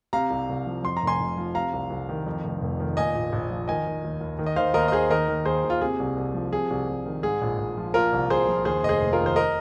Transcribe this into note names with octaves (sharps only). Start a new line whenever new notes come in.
C3 F5 A#5
C2
C2
F3
F2 C6
A#5
F1
G#5 C6
F1
F3
C3 F5 A#5
C2
C2
D#3
F2
F1
F1
D#3
A#2 D#5 G#5
A#1
A#1
F3
D#3 D#5 G#5
D#3
D#2
D#2
D#3
D#5
D#3 C5 F5
D#2 A#4 D#5
D#5
D#2 G#4 C5
D#3 A#4 D#5
D#3
D#2 G#4 C5
D#2
F4
C3 G#4
C2
C2
F3
C3 G#4
C2
C2
D#3
G#2 G#4
A#1
A#1
F3
A#2 F4 A#4
C2
C2 G#4 C5
F3
D#2 G#4 C5
F1 D#5
G#4 C5
F1
F4 A#4
D#3
C5
A#4 D#5